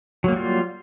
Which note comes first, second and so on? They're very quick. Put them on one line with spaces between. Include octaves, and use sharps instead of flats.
F#3 A#3 G3 F4